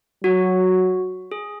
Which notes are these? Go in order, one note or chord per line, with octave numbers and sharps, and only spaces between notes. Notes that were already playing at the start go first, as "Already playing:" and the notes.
F#3 F#4
G#4